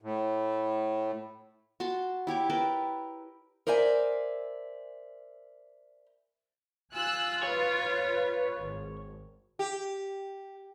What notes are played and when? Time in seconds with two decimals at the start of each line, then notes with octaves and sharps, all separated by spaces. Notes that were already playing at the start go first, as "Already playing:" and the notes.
0.02 A2
1.80 F#4 A5 C6
2.27 E4 G4 C#5 D6
2.50 A#4 B4 G5 A5
3.67 A#4 C5 D5 E5 G#5
6.94 F4 G#5 E6 F#6
7.43 B4 C#5
8.60 G#1
9.59 G4